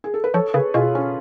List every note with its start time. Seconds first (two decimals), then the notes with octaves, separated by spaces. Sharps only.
0.04 G#4
0.14 A4
0.24 B4
0.34 F3 A4 C#5
0.54 C#3 G#4 B4
0.74 B2 F4 G#4
0.95 C#4